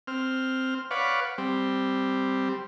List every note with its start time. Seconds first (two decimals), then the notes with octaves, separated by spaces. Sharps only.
0.07 C4 F6
0.91 B4 C#5 D5 F5 F#5
1.38 G3 C4